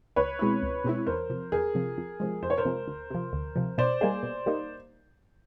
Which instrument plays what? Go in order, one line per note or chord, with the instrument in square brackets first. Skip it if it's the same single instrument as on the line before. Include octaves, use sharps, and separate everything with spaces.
[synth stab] C#2 [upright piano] B4 C#5
[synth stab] B2 G#3 C4 E4
C#2
B2 G#3 C4 E4
[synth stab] E2 [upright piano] A#4 C5
[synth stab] C3 F3
[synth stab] E2 [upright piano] G#4 A#4
[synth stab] C3 F3
F2
C3 F3 G#3
[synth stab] F2 [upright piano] C5
[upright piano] C#5
A#4 C5
[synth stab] C3 F3 G#3
D2
C3 F3
D2
C3 F3
[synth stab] B2 [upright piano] C5 D5
[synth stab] G3 A#3 D#4 G#4
B2
G3 A#3 D#4